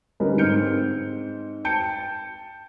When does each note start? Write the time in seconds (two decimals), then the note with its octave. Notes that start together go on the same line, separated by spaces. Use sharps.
0.20 D3 G3 C#4 D#4 A#4 B4
0.38 G#2 C4 F6 G6 C#7
1.64 G5 A5 G6 C#7